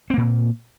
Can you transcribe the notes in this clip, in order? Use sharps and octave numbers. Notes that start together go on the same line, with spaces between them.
A#2 A#3 C4